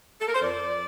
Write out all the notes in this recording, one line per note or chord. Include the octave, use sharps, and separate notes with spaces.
A4
A#4
C5
F2 D5
F2